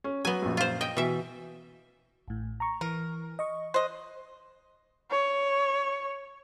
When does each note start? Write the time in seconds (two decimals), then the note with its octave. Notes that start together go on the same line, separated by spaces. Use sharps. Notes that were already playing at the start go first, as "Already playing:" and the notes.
0.04 C#4
0.25 F#3 B3 G#5
0.42 A#1 F#2
0.57 F4 C5
0.81 D#5 G5
0.97 B2 E3 E5
2.28 A1 A2
2.60 A#5 C#6
2.81 E3 A#4
3.39 D#5 C#6
3.74 C5 D#5 F#6
5.11 C#5